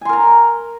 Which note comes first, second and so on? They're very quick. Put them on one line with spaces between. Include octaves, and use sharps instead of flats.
G#5 C6 A#4 A#5